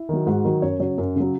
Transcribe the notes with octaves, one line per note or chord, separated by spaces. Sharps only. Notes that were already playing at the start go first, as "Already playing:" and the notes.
Already playing: E4
D#3 F#3
G#2 F#4
D#3 F#3
F#2 C#5
C#3 F#3 C#5
F#2
C#3 F#3